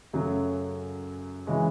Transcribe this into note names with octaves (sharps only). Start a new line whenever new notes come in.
F#2 C#3 F#3 A3
C#3 E3 G#3 C#4